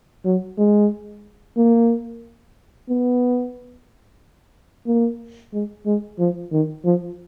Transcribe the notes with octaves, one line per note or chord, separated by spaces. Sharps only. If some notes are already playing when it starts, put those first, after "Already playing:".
F#3
G#3
A#3
B3
A#3
G#3
G#3
F3
D#3
F3